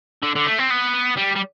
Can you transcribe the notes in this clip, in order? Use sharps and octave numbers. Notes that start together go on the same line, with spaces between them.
D3
D3
A3
C4
B3
G3
G3